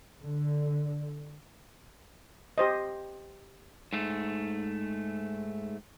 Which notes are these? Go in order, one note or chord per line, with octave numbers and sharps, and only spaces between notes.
D3
G4 C5 D#5
G#2 A3